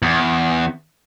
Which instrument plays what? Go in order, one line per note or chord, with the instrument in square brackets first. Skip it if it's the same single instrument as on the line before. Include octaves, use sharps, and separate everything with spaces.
[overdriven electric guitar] E2